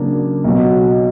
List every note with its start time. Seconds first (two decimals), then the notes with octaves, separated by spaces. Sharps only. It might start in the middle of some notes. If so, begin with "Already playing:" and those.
Already playing: C#3 F#3 A#3 D4
0.44 B1 B2 F#3